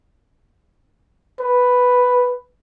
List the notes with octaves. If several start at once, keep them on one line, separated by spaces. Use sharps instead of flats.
B4